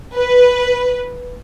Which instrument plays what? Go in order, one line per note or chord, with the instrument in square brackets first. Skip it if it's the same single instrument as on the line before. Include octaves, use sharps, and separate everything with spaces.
[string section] B4